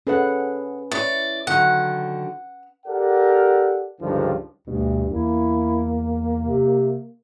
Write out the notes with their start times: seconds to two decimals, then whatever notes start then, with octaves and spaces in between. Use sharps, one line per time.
0.07 C#4 G#4 A4 B4 F#5
0.92 E4 C#5 D5
1.47 D3 D#3 F#3 F#5
2.86 G4 A4 A#4 D5 F#5
4.01 C#2 G2 D3 D#3 F3
4.67 D2 G2 B2
5.11 E2 A#3 E4
6.42 C3